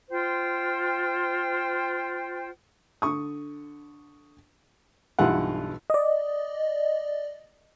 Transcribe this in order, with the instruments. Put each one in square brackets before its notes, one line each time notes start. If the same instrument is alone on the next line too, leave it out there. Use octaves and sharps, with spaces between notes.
[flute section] F4 C5 G5
[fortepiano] D3 C#6 D#6
B1 G2 E3 G3 F4 F#5
[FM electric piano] D5 D#5